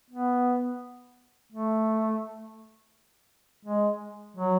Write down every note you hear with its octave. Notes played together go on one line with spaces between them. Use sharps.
B3
A3
G#3
F#3